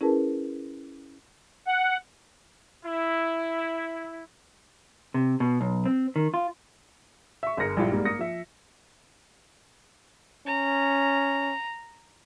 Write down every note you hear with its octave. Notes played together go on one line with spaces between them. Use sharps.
C#4 E4 G#4 A#4 B4 A5
F#5
E4
C3
B2
B1
C4
D#3
F4
E5 C#6
G1 G#4 A#4 A#6 C#7
A#1 G2 E4 F4 G4
G#2 G3 A#3
A#3 D#6 A#6 C#7
F3 E5
C#4 A#5